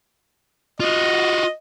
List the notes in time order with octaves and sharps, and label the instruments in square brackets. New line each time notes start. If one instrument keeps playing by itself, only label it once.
[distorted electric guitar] F4 F#4 [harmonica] D#5